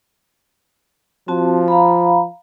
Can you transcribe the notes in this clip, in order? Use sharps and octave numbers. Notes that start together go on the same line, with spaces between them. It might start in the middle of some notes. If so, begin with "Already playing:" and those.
F3 C4 F#4 A5
F5 A#5 B5